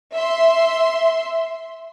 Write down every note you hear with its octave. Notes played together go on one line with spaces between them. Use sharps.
E5 C6